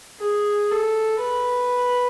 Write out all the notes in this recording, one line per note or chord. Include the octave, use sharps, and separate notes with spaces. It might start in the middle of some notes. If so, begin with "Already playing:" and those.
G#4
A4
B4